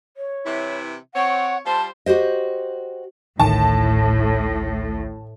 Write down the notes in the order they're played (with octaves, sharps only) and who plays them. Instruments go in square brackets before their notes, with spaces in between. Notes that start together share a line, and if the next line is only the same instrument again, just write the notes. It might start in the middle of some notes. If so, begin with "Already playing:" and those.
[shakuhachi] C#5
[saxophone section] C3 E3 E4
[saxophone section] C4 C#5 [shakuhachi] F#5
[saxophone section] G3 F4 C5 [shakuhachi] A5
[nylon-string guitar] F#4 G4 C5 D#5
[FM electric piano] A1 D2 D#3 [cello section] A2 [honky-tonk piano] A5